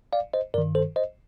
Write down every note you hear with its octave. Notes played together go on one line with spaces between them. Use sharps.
D5 F5
C5 D#5
G2 D#3 A#4 D5
A4 C5
C5 D#5